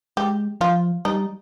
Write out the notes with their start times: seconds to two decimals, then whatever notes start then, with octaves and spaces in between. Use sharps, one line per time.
0.17 G#3 G4
0.61 F3 F4
1.05 G3 D#4